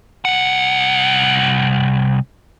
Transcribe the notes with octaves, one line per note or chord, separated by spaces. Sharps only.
C2 F#5